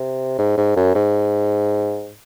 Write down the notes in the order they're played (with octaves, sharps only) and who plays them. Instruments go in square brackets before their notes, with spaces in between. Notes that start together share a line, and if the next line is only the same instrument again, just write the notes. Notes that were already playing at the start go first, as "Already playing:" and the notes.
Already playing: [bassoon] C3
G#2
G#2
F#2
G#2